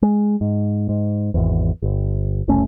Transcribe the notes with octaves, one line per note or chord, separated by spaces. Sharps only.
G#3
G#2
G#2
G#1 E2
G1
F#1 C2 A3 C#4